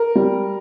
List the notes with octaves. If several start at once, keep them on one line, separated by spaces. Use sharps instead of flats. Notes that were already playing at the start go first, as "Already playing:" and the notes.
Already playing: A#4
G3